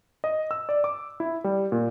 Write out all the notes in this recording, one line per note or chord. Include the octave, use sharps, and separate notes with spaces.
D#5
E6
D5
D6
E4
G3
A#2